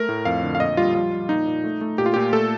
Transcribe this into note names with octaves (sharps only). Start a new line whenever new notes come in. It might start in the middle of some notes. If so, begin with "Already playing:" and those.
Already playing: A3 A#4
A2
F2 F5
D3
F5
A#2 D#5
G3 F4
F3 F4
F3
A#2 D#4
A#2
A3
A3
A#2 G4
F4
A#2 G4
A3 A4